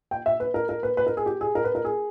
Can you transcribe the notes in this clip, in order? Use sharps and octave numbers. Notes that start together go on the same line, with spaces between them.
G5
E5
B4
A#4
A#4
B4
B4
A#4
G#4
G4
G#4
A#4
B4
A#4
G#4